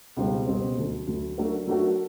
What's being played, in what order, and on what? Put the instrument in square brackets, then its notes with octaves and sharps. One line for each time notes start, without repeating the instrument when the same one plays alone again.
[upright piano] C#2 B2 G3 C4
C#2 B2 G3 C4
D2 D3 F#3 A3
D2 D3 F#3 A3
F#3 A3 D4 F#4 A#4
F#3 A3 D4 F#4 A#4